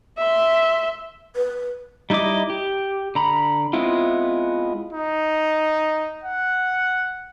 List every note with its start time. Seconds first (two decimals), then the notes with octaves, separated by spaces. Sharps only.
0.18 E5 C6
1.36 B4
2.10 G3 D#4 E4 D#5 D6
2.50 G4
3.15 D3 A#5 B5
3.73 G#3 B3 C4 E4 F4
4.93 D#4
6.24 F#5